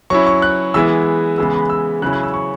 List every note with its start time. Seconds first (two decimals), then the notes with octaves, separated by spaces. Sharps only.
0.10 F#3 C#4 E4 C#6
0.27 C#6
0.42 F#6
0.74 E3 G#3 B3 E4 E6
1.38 C#3 E3 G#3 B3 E6
1.54 B5
1.70 E6
2.02 C#3 F#3 C#4 E4 F#6
2.13 F#6
2.23 E6
2.34 C#6